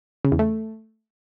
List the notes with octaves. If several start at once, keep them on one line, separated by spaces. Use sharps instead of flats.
C#3
E2
A3